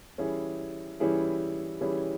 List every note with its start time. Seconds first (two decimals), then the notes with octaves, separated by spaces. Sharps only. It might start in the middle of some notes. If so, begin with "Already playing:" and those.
0.18 E3 G3 C#4 E4 G#4
1.00 E3 G3 C#4 E4 G#4
1.81 E3 G3 C#4 E4 G#4